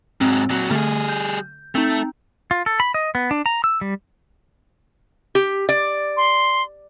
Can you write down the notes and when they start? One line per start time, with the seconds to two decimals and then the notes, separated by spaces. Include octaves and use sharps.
0.21 G#2 F#3 C4
0.50 A#2 F#3
0.71 D3 G3 A3 G#4 F6
1.09 G6
1.75 A3 C4 D#4
2.51 F4
2.66 A4
2.80 B5
2.94 D#5
3.15 B3
3.31 D4
3.46 A#5
3.64 E6
3.81 G3
5.35 G4
5.69 D5
6.17 C6